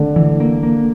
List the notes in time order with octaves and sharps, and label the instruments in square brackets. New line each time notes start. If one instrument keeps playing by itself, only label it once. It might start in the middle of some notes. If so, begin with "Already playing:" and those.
Already playing: [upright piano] D3 [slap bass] A3
[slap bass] E3
A#3
A#3